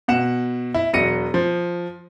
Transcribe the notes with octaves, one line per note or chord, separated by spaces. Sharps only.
B2 F#5 E7
E4
E1 F#3 A#6 C#7 D#7
F3